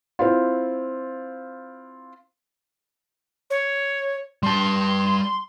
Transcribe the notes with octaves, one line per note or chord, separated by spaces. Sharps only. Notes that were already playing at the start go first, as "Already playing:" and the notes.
C4 E4 F4
C#5
G3 A5 C6